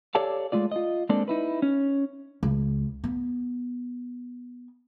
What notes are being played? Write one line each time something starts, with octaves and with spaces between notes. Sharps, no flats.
G4 A4 C#5 D5 F5 A5
G#3 A3 F4 D5
F4 D#5
G#3 A#3 C4 D4 A4 D5
D#4 E4 B4
C#4
C#2
B3